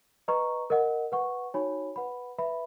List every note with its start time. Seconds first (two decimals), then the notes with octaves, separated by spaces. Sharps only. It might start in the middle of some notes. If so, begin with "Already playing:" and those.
0.28 B4 D#5 A#5 C#6
0.70 A#4 D#5 F#5
1.12 B4 F#5 C#6
1.54 D#4 F#4 C#5 G#5 B5
1.96 B4 F#5 B5
2.38 B4 E5 B5